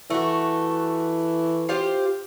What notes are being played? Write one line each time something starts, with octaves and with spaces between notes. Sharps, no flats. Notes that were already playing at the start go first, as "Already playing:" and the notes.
E3 A3 F#4
F4 G4 C5